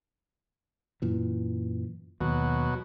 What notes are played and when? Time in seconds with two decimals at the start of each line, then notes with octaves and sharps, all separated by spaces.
1.02 F#2 A#2 E3
2.21 D#2 B2 F#3